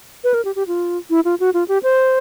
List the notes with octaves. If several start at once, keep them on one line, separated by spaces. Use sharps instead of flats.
B4
A#4
G4
G4
F4
E4
F4
F#4
F4
G4
C5